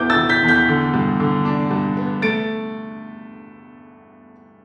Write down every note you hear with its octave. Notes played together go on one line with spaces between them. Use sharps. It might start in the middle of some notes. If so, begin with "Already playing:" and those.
Already playing: E2 E3 B3 E5 D6 G6
E6 A6
E3
G6 B6
E2
G6 B6
D3
G2
D3
D4
G2
B3
A3 A6 D7